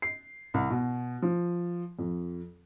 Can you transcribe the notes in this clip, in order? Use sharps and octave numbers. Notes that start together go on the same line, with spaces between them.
C7
C2
B2
F3
F2